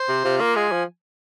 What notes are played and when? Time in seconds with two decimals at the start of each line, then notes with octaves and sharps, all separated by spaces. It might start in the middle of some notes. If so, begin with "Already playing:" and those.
Already playing: C5
0.09 C3
0.25 C3 F4
0.40 A#3
0.56 G#3 G#5
0.72 F3